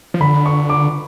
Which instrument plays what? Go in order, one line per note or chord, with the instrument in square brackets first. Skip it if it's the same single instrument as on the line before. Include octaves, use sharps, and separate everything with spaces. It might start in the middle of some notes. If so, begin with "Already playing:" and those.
[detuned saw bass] F3
[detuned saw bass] D3 [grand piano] B5
[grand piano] C#6
D6